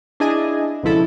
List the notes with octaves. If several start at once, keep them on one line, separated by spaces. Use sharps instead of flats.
D4 E4 G#4 D#5 G#5
C#2 B2 F3 E4 A4